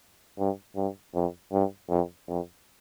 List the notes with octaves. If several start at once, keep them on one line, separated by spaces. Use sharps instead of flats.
G2
G2
F2
G2
F2
F2